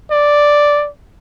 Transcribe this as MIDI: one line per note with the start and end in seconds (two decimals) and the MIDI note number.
0.11 0.88 74